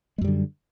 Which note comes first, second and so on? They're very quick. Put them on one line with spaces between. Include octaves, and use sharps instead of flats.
G#3 F#2 G3 D3